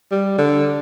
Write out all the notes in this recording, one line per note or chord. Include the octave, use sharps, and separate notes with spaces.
G3
D3